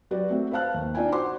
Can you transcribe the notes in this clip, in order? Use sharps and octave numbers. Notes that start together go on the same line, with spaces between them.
F#3 F#4 G4 B4 D5
A3 C4 F#4
B4 C5 F5 A5 F#6
D#2
D4 D#4 F4 D5 G5 G#5
F#4 C5 F#5 C6 D6